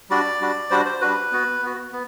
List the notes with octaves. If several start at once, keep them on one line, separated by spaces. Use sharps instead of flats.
G3 D4 F#4 D5
G3 D4 F#4
G3 D4 F#4 C5
C5
G3 D4 F#4 B4
B3 F#4
B3 F#4
B3